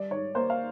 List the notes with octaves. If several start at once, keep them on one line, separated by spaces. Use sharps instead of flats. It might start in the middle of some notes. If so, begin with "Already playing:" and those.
Already playing: G3 D5
G#2 C#5
A#3 C5
F5